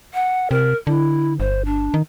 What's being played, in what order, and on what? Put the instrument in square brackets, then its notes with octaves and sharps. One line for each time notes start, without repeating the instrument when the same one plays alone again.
[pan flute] F#5
[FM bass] C3 [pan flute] A#4
[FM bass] D3 [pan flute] E4
[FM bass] G1 [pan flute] C5
[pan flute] D4
[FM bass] D#3